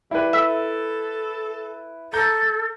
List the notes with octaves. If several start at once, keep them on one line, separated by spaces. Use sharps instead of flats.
G3 E4 B4
A4 E5
A4 A#5 G6 A#6